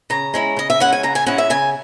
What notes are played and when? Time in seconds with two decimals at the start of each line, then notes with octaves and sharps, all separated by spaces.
0.10 C#3 A#5
0.34 G#3 C#4 E4
0.57 C#3 D#5
0.70 E5
0.80 G#3 C#4 E4 F#5
0.93 G#5
1.03 C#3 A#5
1.15 G#5
1.26 G#3 C#4 E4 F#5
1.38 E5
1.50 C#3 G#5